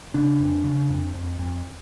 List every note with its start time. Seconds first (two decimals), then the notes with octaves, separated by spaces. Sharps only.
0.14 C#3 D4
0.40 F2
0.64 C#3
0.90 F2
1.15 F2
1.39 F2